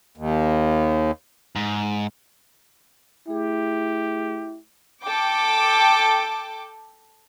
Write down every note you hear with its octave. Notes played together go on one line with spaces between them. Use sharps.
D#2
G#2
A3 E4 G4 G#4
A4 G5 D6